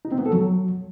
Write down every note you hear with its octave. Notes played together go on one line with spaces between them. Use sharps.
D#4
C4
B3
A4
F#3